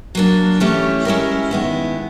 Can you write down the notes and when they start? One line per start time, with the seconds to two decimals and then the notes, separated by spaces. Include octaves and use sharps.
0.15 F#3 A#3 D4
0.60 E3 A3 C#4 E4 G4
1.05 G#3 C#4 E4 G4 A#4
1.51 D#3 G#3 B3 E4